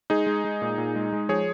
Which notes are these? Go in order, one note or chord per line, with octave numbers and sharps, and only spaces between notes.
G#3 D#4 G#4
G#3
G#3
A#2
A#2
G#3
G#3
F3 G#4 C#5